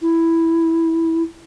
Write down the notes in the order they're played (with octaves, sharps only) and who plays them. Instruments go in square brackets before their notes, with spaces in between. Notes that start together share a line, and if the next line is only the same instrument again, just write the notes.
[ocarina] E4